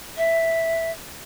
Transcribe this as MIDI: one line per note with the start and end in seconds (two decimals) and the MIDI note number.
0.17 0.91 76